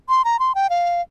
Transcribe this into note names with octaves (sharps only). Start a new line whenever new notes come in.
C6
A#5
C6
G5
F5